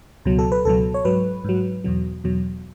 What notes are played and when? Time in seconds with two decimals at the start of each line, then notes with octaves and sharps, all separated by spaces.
0.25 C#2 B2 F#3
0.39 A4
0.52 B4
0.65 C#2 B2 F#3 A4
0.94 C#5
1.05 G#2 F#3 B4
1.45 G#2 F#3
1.84 E2 B2 F#3
2.24 E2 B2 F#3